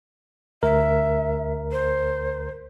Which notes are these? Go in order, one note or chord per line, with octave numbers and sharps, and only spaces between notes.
D2 A#4 E5
C5